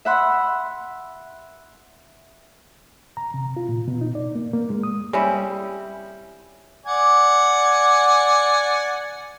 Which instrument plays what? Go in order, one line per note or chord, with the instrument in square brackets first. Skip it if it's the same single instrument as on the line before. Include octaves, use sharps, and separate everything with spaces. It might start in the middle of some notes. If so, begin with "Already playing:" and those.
[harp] E5 F#5 B5 C6
[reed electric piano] A#5
C3
F4
A#2
B2
D#4
D5
A#3
A#3
G#3
D#6
[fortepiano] G3 [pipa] C4 C#4 E4
[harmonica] D5 F#5 G#5